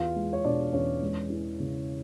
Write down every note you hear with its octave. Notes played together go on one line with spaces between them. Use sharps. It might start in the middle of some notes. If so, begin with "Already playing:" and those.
Already playing: E2 F4 F5
G#3
C#5
B2 D4 D5
E2 C#4 C#5
G#3
E3
C#3